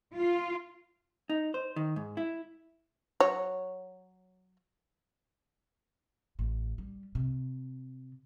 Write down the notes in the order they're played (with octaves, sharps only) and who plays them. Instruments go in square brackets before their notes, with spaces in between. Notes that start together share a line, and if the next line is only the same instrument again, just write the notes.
[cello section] F4
[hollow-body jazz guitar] D#4
C5
D#3
G#2
E4
[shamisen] F#3 C#5
[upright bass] A1
G3
C3